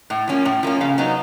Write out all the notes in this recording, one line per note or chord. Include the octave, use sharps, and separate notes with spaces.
A2
F3 A#3 C#4
A2
F3 A#3 C#4
C#3 F5
F#3 B3 D#4